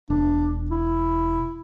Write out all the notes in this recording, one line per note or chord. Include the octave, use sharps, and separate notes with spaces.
E1 D4
E4